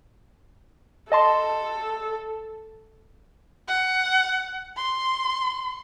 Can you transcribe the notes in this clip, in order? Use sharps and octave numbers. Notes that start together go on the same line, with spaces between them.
A4 D#5 A5 C6
F#5
C6